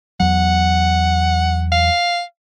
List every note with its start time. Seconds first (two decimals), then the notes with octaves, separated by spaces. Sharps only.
0.20 E2 F#3 F#5
1.72 F5